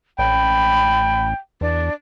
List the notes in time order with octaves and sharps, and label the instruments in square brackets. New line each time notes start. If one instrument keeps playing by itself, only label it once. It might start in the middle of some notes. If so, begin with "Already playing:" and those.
[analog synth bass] A1 [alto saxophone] G5 [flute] B5
[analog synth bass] E2 [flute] D4